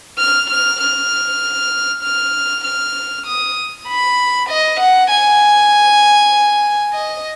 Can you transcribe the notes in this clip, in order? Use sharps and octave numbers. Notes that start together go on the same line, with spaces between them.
F6
F6
F6
F6
F6
D#6
B5
D#5
F#5
G#5
D#5